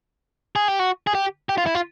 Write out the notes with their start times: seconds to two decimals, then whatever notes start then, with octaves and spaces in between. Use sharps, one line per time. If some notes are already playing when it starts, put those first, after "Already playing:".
0.56 G#4
0.68 G4
0.79 F#4
1.07 G#4
1.15 G4
1.49 G4
1.58 F4
1.66 E4
1.75 F4